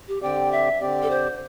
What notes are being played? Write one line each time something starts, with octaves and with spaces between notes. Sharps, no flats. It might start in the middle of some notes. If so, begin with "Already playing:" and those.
G4
D3 C4 G4 D5 G5
E5
D3 C4 G4 D5
A4
C5